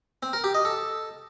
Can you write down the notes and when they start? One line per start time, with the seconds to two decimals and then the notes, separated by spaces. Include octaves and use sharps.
0.23 C4
0.33 A#4
0.44 G4
0.54 D#5
0.65 A4